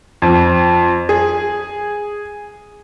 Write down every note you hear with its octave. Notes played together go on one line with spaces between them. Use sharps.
F2
G#4